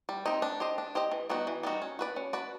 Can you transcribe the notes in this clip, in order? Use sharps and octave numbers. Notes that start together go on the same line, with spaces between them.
G3
C4 D#4 G4
D4
G4 C5 D#5
D4
G4 C5 D#5
E3
G3 B3 D#4 F#4
E3
G3 B3 D#4 F#4
C#4
F#4 B4 D5
C#4
F#4 B4 D5